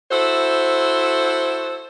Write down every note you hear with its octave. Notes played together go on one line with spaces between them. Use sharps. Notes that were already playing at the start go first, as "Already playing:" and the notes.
E4 F#4 A4 C5